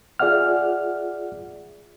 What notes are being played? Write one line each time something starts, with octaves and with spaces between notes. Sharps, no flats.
F4 G#4 D5 E5 F#5 F6